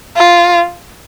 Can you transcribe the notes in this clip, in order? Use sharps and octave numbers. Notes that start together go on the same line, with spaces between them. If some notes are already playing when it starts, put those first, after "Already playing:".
F4